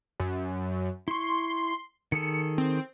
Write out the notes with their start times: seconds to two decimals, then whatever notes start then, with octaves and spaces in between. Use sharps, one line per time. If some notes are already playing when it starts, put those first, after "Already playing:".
0.20 F#2
1.08 E4 C6 C#6
2.12 D#3 G#4 A4 C#7
2.58 C4